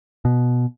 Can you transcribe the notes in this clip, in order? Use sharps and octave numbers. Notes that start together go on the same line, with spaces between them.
B2